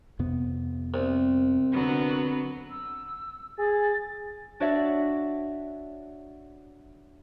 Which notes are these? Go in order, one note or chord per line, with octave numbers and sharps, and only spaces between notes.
F2 C3 B3
C2 C4
D3 F#3 B3
E6
G#4 A6
D4 F#4 C#5 D5 E5 F#5